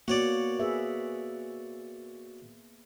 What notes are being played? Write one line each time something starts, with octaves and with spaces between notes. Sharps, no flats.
A#3 B3 F#4 C#5 D5
G#4 B4 E5